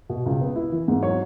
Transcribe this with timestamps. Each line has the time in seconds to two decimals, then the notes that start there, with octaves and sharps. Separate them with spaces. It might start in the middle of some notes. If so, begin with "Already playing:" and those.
0.09 B2
0.26 C#2
0.41 B3
0.56 E4
0.72 E3
0.88 G#2
1.02 F#3 C#5